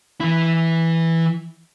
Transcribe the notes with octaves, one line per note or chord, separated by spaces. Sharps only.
E3 E4